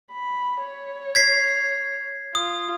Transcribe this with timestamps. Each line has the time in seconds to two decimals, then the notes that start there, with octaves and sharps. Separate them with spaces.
0.12 B5
0.61 C#5
1.15 G#6 B6 C7
2.35 F4 D#6